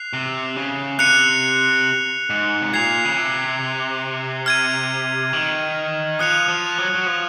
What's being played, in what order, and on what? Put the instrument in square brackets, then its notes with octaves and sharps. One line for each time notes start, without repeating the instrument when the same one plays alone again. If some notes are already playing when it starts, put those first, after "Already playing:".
Already playing: [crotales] F#6 C7 F7
[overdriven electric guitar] C3
C#3
[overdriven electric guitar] C3 [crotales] F#6 C#7 F7
[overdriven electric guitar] G#2
C3
[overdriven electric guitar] A#2 [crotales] G#6 C7 F7
[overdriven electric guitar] C#3
C3
[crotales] F6 G#6 D#7
[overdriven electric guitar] D#3
[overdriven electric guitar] F3 [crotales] D#6 F#6 C#7 F7
[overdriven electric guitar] F3
F#3
F#3
F3